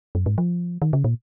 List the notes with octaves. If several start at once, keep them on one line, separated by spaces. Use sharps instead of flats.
F#2
G#2
F3
D#3
C#3
A#2